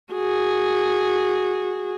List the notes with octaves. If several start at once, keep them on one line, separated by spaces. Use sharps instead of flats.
F#4 G#4